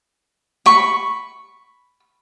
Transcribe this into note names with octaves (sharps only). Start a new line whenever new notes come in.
B5 C#6